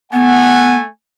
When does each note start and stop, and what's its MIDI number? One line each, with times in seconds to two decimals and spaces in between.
0.12 0.87 57
0.12 0.75 59
0.12 0.79 78
0.12 0.87 80